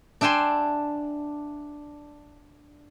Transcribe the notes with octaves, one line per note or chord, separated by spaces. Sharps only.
D4 E5 G5 G#5 C6